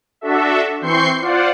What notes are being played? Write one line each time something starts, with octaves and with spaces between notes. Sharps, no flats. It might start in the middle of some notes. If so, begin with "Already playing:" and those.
D4 F#4 A4 E5
E3 C4 C6 C#6 G6 C7
F4 C5 D5 F#5